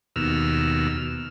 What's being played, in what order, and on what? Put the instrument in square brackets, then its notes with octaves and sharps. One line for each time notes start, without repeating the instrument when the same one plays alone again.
[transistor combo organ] D#2 B2 E6 F6